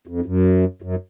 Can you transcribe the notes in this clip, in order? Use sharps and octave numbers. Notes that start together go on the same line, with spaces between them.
F2
F#2
F#2